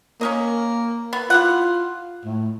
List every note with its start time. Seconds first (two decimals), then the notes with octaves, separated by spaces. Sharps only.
0.21 A#3 C#4 A#4 D#5
1.13 B3
1.30 E4 F4 G4 F#5
2.25 A2